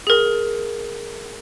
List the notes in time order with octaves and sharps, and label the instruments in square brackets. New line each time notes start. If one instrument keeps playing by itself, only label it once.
[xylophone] G#4 A#4